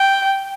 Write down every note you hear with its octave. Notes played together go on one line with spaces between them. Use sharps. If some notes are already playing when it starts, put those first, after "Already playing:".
Already playing: G5